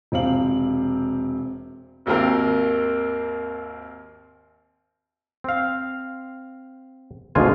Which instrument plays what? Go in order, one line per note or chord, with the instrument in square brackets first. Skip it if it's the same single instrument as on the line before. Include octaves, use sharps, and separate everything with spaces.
[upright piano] E1 C3 C4 F5 F#7
[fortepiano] G#1 D#2 A#3 C4 A#4
[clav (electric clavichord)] C4 F5
G#1 D2 B2 G#3 F4 G#5